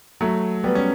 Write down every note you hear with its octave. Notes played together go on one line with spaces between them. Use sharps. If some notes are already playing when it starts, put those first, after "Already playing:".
F#3 A3
G3 B3
C#4